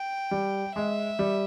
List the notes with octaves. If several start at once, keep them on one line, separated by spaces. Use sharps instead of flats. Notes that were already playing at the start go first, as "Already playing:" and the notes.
Already playing: G5
G3
G#3 E5
G3